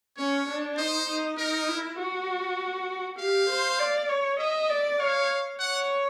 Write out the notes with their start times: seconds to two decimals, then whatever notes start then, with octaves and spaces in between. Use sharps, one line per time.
0.17 C#4 C#5
0.48 D4
0.77 D#4 C5
1.08 D#4
1.38 D#4 A#4
1.68 E4
1.98 F#4
3.18 G4 F5
3.49 C5
3.79 D5
4.09 C#5
4.39 D#5 E5
4.69 D5
4.99 C#5 F5
5.59 C#5 F#5